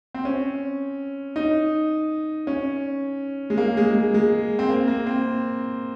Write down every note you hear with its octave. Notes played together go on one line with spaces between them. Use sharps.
C4
C#4
D#4
C#4
G#3
A#3
G#3
G#3
G#3
C4
A#3
A#3
C4